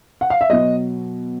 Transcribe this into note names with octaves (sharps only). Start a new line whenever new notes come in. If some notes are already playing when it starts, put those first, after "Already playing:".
F#5
F5
E5
B2 F#3 B3 D#5